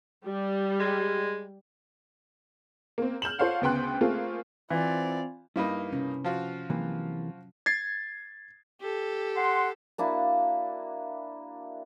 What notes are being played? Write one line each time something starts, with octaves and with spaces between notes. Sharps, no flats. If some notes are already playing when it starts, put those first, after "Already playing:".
G3
G#3
A#3 C4
F6 G6 E7 F#7
F4 A4 C5 C#5 F5 F#5
D2 C#3 B3 G5 C6 F#6
A3 A#3 C4 F4 G#4
E3 C4 F4 D5
G2 A#3 D#4 E4 B4
C3 C#4
F3 F4 F#4
C3 E3 F#3 A#3
G#6 A6 C7
G4 A4
F#5 C6
A#3 D4 E4 F#4